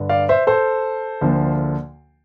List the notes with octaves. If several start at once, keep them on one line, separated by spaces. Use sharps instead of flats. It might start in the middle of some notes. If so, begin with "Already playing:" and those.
Already playing: G2 D3 D4
D5 F5
C5 E5
A4 C5
D2 D3 F3 A#3 D4